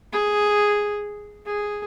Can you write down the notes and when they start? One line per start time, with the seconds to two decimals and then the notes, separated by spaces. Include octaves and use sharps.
0.13 G#4
1.46 G#4